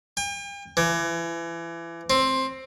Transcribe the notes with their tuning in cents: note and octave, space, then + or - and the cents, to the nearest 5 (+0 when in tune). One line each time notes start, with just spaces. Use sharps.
G5 +45
E3 +30
C4 +10